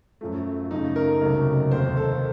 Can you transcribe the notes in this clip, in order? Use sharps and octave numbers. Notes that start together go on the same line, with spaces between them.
F#2 F3 A3
F#2 C#3 A3 D#4
A#4
C#2 C3 F#3 A3
F1 D#2 D#3 A#3 C5
A4